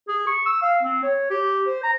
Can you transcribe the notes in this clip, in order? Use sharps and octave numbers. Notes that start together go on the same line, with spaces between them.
G#4
C#6
E6
F5
C4
C#5
G4
C5
A#5